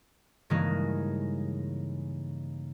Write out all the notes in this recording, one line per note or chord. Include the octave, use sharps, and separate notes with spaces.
G2 C#3 E3 G#3 A#3 D#4